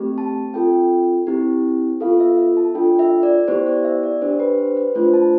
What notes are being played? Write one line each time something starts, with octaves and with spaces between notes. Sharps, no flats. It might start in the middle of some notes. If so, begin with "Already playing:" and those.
Already playing: A3 C4 G4
A5
C4 F4 A4 G5
C4 E4 G4
B3 F4 A4 F5
E5
E5
A5
D4 F4 A4 G5
E5
D5
B3 E4 G4 C5
D5
E5
D5
D4 G4 C5
B4
C5
B4
A3 D4 F4 C5
A5